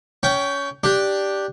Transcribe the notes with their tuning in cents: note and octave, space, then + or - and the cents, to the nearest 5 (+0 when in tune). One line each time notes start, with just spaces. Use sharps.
C#4 +20 G5 -15
D4 +0 G4 +0